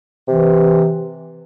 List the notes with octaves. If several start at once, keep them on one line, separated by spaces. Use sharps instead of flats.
C3 E3